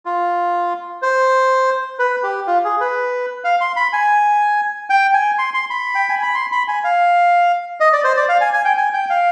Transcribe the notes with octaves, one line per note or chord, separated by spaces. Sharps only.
F4
C5
B4
G4
F4
G#4
B4
F5
C6
B5
G#5
G5
G#5
C6
C6
B5
G5
G#5
B5
C6
B5
G#5
F5
D#5
D5
C5
D5
F5
G#5
G#5
G5
G#5
G5
F5